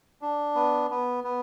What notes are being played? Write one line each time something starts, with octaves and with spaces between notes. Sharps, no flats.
D4
B3
B3
B3